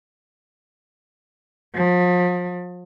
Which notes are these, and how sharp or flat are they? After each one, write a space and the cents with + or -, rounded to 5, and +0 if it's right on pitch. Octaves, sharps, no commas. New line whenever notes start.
F3 +35